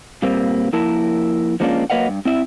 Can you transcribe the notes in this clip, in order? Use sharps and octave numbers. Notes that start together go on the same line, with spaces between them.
A#2 G3 A#3 C4
F3 A#3 E4 A#4 A5
F3 G#3 A#3 C#4 D4 F4
F#3 A#3 B4 D#5 F5 F#5
G2
C4 E4 E5